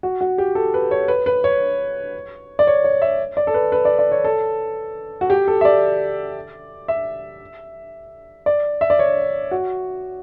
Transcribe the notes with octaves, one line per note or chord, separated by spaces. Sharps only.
F#4
F#4
G4
A4
B4
C#5
B4
B4
C#5
D5
C#5
C#5
E5
D5
A4
B4
B4
D5
D5
C#5
A4
F#4
G4
A4
E5
D5
E5
D5
E5
D5
C#5
F#4